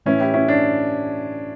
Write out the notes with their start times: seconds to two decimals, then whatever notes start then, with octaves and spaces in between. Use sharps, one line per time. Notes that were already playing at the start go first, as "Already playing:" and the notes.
0.06 A2 E3 C#4 E4
0.20 E4 G4
0.34 C#4 E4
0.48 D4